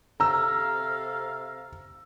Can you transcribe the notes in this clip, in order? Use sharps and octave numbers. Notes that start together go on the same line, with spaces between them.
C3 A4 F5 A#5 E6